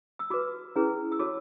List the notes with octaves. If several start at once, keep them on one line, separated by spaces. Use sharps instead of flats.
E6
F#4 B4 D6
C#4 E4 G#4 B4
E6
F#4 A4 C#5 D6